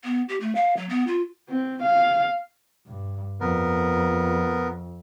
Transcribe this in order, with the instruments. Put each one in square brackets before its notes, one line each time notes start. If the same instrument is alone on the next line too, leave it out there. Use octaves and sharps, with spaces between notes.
[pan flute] B3
G4
A3
F5
F#3
B3
F4
[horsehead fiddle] C4
F5
[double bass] G2
[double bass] F2 [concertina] B3 A#4